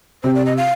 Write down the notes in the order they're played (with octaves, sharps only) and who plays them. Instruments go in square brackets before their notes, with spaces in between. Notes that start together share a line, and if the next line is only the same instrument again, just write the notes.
[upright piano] C3 [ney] C5
[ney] D5
D#5
F5